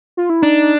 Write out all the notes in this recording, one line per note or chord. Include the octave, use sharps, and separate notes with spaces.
F4
E4
D4 D#4